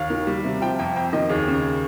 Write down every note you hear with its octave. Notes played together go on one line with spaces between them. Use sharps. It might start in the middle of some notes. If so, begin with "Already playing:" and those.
Already playing: D#2 F5
D#3
G3
C3
F3 G5
F2 G5
F2 G5
D#3 D#5
D#2 G#4
C#3